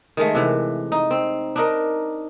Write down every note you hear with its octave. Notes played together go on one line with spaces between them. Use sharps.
D#3 G#3 A3
C3 E3
D#4
C4
D4 D#4 A#4